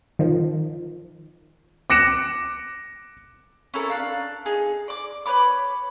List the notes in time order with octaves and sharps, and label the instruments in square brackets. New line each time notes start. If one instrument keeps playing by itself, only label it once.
[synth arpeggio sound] D#3 F3
[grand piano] D6 F#6 A#6 C#7 D7 E7
[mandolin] C#4 E4 A4 A#4
D4 F5
D#4 G#4
D5 D6
B4 C#5 B5 D6